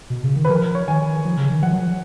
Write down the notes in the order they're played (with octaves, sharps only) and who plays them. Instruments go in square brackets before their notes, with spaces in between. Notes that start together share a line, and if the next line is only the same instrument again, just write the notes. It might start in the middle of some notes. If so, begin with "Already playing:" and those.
[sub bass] B2
C#3
D#3
[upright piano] B4
[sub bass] F3 [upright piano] A#4
[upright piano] C#5
[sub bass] D#3 [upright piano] G#5
[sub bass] F3
C#3
D#3
[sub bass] F3 [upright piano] F#5
[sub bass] F#3
F3